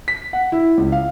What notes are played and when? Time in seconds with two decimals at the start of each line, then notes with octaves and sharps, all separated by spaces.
0.08 B6
0.33 F#5
0.52 E4
0.77 C#2
0.92 F5